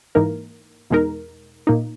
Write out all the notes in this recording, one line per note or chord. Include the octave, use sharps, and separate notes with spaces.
G#2 E3 A#3 D#4 A#4
E2 B2 G#3 D#4 A#4
A#2 A#3 D#4